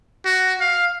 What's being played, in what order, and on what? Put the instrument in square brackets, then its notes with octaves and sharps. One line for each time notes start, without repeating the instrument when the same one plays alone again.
[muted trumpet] F#4
F5